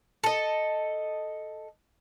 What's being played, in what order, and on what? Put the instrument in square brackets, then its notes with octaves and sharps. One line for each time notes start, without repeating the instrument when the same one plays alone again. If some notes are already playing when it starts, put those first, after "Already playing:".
[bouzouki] A4 D#5